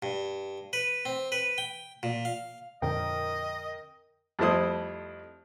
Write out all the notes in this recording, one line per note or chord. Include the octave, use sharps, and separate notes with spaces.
G2
B4
C4
B4
G5
A#2
F5
F2 A#2 D3 A#4 D#5 G5
F2 G3 A3 E4 C5 D#6